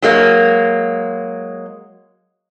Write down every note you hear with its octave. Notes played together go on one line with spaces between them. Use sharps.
F#3 G#3 A#3